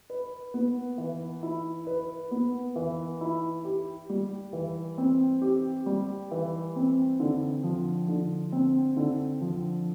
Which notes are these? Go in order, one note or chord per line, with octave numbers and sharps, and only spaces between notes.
B4
B3
E3
E4
B4
B3
E3
E4
G4
G3
E3
C4
G4
G3
E3
C4
D3
F3
D3
C4
D3
F3